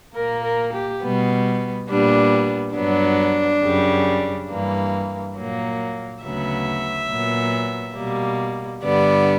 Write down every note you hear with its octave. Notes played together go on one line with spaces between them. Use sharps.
A#2 A#3 A#4
A#4
G4
B2 G3 B3
A#2 G3 B3 D4
G2 F#3 B3 D4
F#2 C#3 G3
G2 E3 A#3
A#2 F#3 A#3
D2 C#3 F#3 B3 E5
A#2 F#3 B3
B2 G3 A#3
G2 D3 G3 B3 D5